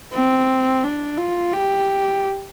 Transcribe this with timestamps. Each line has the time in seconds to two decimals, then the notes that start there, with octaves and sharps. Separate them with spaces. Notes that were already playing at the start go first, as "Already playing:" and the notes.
0.13 C4
0.84 D4
1.18 F4
1.53 G4